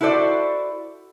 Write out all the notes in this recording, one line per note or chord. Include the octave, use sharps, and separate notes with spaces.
E4 F#4 A4 C5 D5